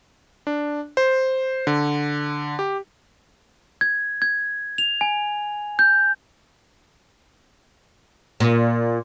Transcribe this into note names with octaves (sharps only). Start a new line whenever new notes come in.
D4
C5
D3
G4
G#6
G#6
F7
G#5
G6
A#2